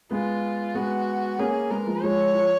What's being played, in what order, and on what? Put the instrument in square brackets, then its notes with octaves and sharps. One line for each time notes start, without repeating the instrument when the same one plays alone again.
[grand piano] G#3 B3 [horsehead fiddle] F4
[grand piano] G#3 B3 [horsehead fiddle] F#4
[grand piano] A#3 C#4 [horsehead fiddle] G#4
[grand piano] G#3 B3 [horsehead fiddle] A#4
[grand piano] F3 G#3
[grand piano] F3 G#3 [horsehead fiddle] C#5
[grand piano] F3